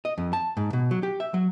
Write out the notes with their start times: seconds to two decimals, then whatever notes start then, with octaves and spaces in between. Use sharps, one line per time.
0.05 D#5
0.18 F2
0.33 A5
0.57 G#2
0.73 B2
0.91 F#3
1.03 G4
1.20 E5
1.34 F#3